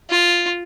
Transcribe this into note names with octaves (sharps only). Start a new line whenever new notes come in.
F4